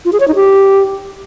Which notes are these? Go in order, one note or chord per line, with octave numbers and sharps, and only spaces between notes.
F4
G#4
C#5
D#4
G4